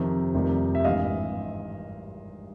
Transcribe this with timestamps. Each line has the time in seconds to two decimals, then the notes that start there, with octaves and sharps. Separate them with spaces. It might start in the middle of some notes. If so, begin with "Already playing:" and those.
Already playing: F2 C3 D#3
0.34 F1 F2 C3 D#3 G3
0.75 E5
0.84 G#1 G2 E3 D#5 F5